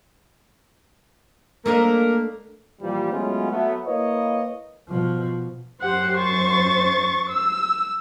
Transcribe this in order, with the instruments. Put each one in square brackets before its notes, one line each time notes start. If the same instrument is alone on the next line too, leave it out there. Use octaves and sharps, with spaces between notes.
[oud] A3 D4 D#5 [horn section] A#3 A#4
[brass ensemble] A#2 E3 F3 G3
F#3 G#3 A3 B3 C#4 F4
F#3 A3 B3
A#3 E4 B4 C#5 D#5
[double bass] B2 F3
[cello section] F#2 C5 [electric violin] G4 F#5
[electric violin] C#6 A6
E6